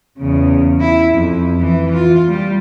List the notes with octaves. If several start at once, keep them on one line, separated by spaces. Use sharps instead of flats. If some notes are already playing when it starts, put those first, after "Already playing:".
E2 C#3
E4
F2
E3
F4
G3